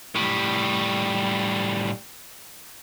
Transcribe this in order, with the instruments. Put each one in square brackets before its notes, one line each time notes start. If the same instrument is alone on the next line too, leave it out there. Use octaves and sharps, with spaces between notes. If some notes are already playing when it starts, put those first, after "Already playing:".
[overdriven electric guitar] A2 G3